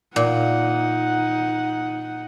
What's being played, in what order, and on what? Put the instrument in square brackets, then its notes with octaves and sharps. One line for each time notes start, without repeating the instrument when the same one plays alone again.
[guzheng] A#2 [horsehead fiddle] D#4 F#5